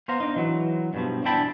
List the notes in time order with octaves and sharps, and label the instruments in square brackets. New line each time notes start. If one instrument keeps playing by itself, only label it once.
[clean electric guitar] B3 C5 F5 A#5
D4 D#4
E3 F#3
G2 B2 F3
E2 D4 E4 G5 A5 B5